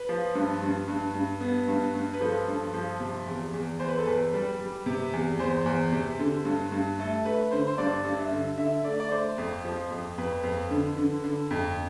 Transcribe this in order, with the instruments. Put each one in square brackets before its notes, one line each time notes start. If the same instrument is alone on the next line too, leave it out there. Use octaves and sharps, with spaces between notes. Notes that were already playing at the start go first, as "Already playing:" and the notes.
Already playing: [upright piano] B4
F3
G2
G2
G2
G2
B3
G2
G2
B4
F3 A4
G2
F3
C3
E2
E2
E2 C5
B4
A4
E2 B4
G3
G3
C3
E2
E2 C5
E2
C3
D3
G2
G2
A3 A4
A3 B4
D3 C5
C5
G2 D5
G2
E5
D3
D3 E5
A3 D5
D5
A3 C5
F2
F3
F2
F2 B4
F2
D3
D3
D3
F2